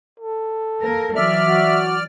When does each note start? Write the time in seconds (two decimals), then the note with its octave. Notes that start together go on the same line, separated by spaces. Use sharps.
0.20 A4
0.81 A#3 A#4
1.15 E3 F#3 D5 E5 F6
1.48 F#4